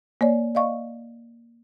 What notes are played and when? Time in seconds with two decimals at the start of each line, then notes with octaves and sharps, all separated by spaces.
0.21 A#3 C#5 D5
0.55 D5 D#5 F5 C#6